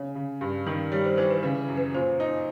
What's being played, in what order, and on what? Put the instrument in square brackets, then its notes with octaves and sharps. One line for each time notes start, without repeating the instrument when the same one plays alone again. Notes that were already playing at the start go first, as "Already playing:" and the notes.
Already playing: [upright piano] C#3 [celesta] C#5
[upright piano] C#3
G2
D#3
[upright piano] G3 [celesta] C#5
[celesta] C5
[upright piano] E3 [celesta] C5
[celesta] B4
[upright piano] C#3 [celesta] B4
[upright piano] F#2
[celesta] B4
[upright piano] A#2 [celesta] C5
[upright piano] D#4